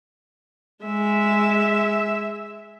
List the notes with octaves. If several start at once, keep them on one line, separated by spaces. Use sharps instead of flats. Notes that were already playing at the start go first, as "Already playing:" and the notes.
G#3 E5